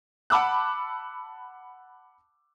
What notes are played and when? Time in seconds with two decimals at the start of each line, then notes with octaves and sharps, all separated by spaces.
0.30 F#5 A5 B5 D6 E6 F#6